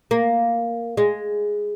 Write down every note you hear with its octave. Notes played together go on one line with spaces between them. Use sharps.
A#3
G#3